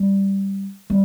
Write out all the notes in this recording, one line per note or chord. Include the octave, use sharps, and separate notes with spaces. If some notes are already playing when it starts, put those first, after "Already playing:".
Already playing: G3
G3